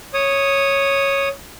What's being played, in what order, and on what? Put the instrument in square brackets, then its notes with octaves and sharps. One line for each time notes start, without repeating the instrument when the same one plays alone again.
[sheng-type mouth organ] C#5 D#6